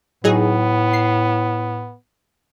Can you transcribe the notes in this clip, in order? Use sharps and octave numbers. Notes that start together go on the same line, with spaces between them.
A2 F#3 B3 D#4 G#4
C7